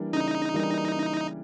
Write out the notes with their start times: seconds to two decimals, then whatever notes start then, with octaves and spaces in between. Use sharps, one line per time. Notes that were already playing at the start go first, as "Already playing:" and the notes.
Already playing: E3 G3 A#3 D4
0.13 C#3 D#4
0.54 E3 G3 A#3 D4
0.95 C#3